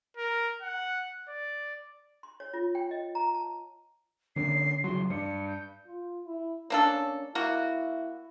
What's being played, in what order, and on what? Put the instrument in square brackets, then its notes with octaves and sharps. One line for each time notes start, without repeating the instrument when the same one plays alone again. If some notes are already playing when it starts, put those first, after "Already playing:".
[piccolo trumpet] A#4
F#5
D5
[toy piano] C6
C#5
F4
G5
D#5
A#5
A5
[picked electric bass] D3 A#3 C#4 [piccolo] C7
[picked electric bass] C#3 E3 F#3 [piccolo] C6
[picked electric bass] G2 [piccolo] C#7
[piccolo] G6
[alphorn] F4
E4
[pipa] A#3 D4 A4 [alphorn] C#4
[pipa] A#3 F#4 [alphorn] E4